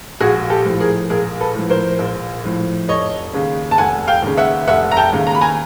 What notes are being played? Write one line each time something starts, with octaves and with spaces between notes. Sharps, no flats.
A#1 F#4 G#4
G4 A4
A2 F3
G#4 A#4
A#1 G#4 A#4
A4 B4
A2 F3
A#4 C5
A#1
A2 F3
F1 C#5 D#5
D#2 C#3
A5
F1 F#5 G#5
F5 G5
D#2 C#3
E5 F#5
F1 E5 F#5
A#5
G5 A5
D#2 C#3
A#5
B5
G#5 A#5